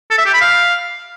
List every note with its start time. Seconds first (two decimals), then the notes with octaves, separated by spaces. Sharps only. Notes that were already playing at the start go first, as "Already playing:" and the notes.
0.10 A4
0.18 E5
0.26 G4
0.33 B5
0.41 F5